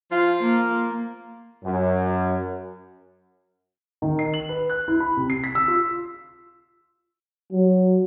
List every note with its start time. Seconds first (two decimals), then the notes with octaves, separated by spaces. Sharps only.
0.10 F3 F4
0.41 A#3
1.63 F#2
4.02 D#3
4.19 C7
4.34 F#7
4.49 B4
4.70 F#6
4.88 E4
5.00 B5
5.17 C3
5.30 C7
5.44 B6
5.55 E6
5.68 F4
7.52 F#3